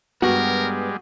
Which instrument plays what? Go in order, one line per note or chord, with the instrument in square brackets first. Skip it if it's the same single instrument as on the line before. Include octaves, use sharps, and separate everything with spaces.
[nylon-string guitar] G2 B3 [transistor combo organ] G3 G#3 [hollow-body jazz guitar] F#4 [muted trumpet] A#4